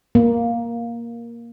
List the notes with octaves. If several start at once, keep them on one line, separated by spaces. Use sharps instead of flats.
A#3